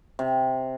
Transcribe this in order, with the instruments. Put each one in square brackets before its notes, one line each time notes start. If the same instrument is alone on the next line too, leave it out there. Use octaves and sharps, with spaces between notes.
[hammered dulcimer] C3